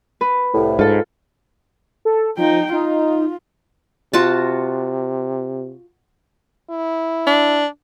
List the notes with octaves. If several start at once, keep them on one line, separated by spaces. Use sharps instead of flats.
B4
C2 A2
G#2 F4 A4
A4
F3 D#4 G5
D#4 F4
C3 F4 F#4 A5
E4
D4